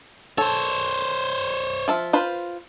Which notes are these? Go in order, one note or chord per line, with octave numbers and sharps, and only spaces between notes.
A4 C5 C#5
F3 F4 E5
F4 B4 C5